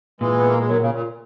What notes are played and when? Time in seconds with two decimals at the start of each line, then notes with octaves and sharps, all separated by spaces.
0.20 A#2 E3 G#3
0.38 B3
0.48 A#3
0.59 G#3
0.68 D#3 F#3
0.82 C#3
0.93 A#2